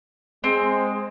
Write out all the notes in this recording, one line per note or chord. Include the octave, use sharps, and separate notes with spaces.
G#3 C4